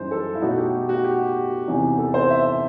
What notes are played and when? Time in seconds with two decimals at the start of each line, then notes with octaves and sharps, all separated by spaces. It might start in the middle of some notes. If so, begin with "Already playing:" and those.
Already playing: F#2 E3 G3 D#4 C5
0.11 A4
0.35 E4
0.42 B2 A3 D#4 F#4
0.58 G4
0.89 F#4
1.04 G4
1.67 E2 C3 E3 B3 D#4
1.98 A4
2.14 C5
2.30 E5